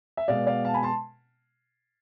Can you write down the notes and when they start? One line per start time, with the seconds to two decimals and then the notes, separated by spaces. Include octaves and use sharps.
0.17 E5
0.28 B2 G#3 B3 D5 F5
0.47 D5 F5
0.65 F5 A5
0.74 G#5 B5
0.83 A5 C6